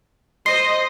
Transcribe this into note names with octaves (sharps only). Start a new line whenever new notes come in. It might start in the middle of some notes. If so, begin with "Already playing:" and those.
C5 D#5 C6 C7